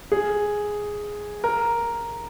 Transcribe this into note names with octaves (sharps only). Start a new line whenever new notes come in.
G#4
A#4